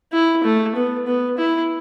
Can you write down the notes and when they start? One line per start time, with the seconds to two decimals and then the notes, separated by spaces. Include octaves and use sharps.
0.13 E4
0.44 A3
0.75 B3
1.07 B3
1.37 E4